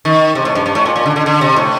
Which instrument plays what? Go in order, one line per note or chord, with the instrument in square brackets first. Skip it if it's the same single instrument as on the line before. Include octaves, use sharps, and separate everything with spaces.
[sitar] D#3
C3
A2
G2
G2
A2
A#2
A#2
D3
D3
D3
C3
A2